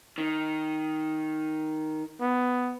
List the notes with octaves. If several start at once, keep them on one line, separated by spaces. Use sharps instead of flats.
D#3
B3